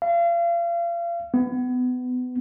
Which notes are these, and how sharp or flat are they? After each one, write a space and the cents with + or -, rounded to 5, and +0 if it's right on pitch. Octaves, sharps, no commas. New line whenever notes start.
F5 -35
B3 +25